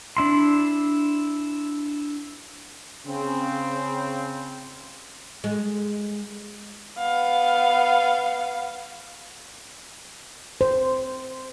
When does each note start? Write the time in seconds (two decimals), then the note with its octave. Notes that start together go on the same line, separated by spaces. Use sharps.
0.17 D4 E4 C6
3.07 C#3 C4
5.44 G#3
6.98 B3 F5
10.61 C5